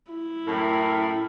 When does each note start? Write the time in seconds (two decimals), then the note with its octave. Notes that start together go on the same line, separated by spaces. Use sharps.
0.12 E4
0.46 F#2 A2 A#4